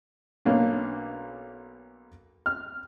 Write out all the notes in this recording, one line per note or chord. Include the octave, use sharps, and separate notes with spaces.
B1 A#3 C#4 D4
F6